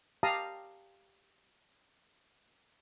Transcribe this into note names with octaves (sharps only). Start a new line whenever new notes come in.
G4 F5 A5 A#5 D#6